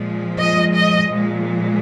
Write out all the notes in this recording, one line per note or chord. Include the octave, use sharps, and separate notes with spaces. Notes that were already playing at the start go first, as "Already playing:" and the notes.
Already playing: A#2 F3 G#3
D#5
D#5
A#2 F3 G#3